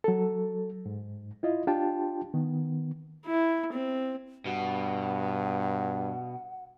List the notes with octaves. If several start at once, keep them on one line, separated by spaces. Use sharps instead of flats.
F#3 A4
G#2
E4 F4 D#5
D4 F4 G4 G5 A5
D#3 B3
E4
C4
G2 B2 F#5